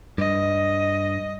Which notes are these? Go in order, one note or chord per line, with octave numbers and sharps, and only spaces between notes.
G2 D#5